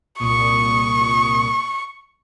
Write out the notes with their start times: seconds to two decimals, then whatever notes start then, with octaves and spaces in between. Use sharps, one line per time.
0.19 C2 A#2 C#6 D#6